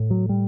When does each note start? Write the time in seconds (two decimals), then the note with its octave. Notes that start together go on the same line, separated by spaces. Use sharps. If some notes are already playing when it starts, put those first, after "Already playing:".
Already playing: A2
0.11 F#3
0.29 G3